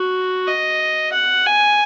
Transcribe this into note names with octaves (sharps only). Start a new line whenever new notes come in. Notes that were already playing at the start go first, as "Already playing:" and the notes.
Already playing: F#4
D#5
F#5
G#5